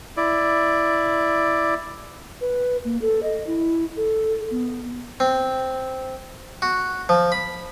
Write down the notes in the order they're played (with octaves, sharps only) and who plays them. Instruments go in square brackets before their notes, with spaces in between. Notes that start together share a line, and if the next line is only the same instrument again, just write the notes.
[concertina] E4 D5
[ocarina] B4
A#3
A4
D#5
E4
A4
B3
[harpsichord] C4
F#4
F3
B5